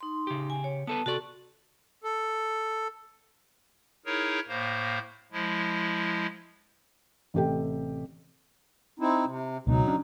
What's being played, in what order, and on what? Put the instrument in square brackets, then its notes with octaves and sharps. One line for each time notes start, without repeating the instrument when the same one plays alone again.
[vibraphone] D#4 C6
[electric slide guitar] C#3 G4
[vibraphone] G#5
C#5
[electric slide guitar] B3 A4 B4 [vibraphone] A5
[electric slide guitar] C3 D5 [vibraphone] F#4 A4 C#6
[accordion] A4
[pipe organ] D#4 E4 G#4 A#4 C#5
A2 A#3 C5
F3 G#3 E4
[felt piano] A1 C3 G4 A4 G5
[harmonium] C4 D#4 E4
C3
[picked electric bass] C#2 B2 [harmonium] F#3 D#4
[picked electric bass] C#4 D4